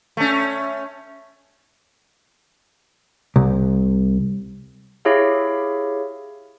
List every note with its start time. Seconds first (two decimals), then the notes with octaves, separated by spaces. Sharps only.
0.17 A3 C#4
3.36 C2
5.05 E4 G4 G#4 C#5 E5 F5